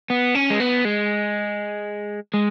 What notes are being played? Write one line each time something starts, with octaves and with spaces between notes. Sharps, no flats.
B3
C#4
G#3
B3
G#3
G#3